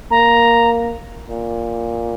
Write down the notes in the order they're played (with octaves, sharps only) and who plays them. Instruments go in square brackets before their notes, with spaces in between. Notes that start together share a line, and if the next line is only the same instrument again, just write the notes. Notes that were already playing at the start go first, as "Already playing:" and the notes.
[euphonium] A#3 [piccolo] A#5
[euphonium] A#2